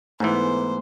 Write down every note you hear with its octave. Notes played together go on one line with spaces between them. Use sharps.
G#2 E3 A3 B3 C5